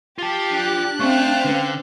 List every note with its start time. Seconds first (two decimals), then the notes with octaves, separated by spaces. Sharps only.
0.18 F4 G4 A5
0.51 D4 F#6
1.00 A3 C4 C#4 C5 E5 F5 G5 C#6
1.45 D3 G#3 C#4 B4